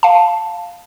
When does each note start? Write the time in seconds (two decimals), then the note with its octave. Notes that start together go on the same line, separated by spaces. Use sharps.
0.03 F5 A5